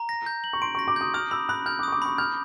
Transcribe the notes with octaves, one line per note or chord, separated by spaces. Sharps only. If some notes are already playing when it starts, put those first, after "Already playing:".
Already playing: A#5
A#6
G6
F#7
C#6
C6 D7
C#6
A#6
D6
D#6 G6
D#6 F6
B5 E6
B5 F#6
F6 G6
D6
C#6 D#6
D6
B5 C#6
F6 G6